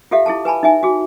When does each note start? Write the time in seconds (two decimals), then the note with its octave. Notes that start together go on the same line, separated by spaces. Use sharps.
0.11 F4 G4 A4 E5 F5
0.26 E4 G#4 A4 A5
0.45 B4 G#5 A5 B5
0.63 D#4 E5 G#5
0.83 F#4 G#4